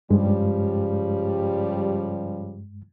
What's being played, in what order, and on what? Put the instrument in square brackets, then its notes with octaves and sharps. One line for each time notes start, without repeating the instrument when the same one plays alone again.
[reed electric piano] G2 G#3 [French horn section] C#3 F3 G3